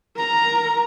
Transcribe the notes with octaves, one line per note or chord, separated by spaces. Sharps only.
A#4 A#5